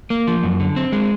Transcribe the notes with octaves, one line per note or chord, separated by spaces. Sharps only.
A#3
F3
F#2
D3
C4
G#3